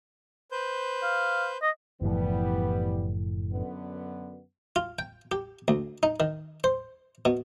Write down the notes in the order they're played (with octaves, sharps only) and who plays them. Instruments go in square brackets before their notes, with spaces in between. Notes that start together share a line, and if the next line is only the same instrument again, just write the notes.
[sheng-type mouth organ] B4 C5 G6
[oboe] F5
D#5
[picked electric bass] F#1 A2 F3 [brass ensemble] E3 G3 B3
[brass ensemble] F#2 D3 B3
[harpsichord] F4
G5
G4
D2
D#4
D#3
C5
B2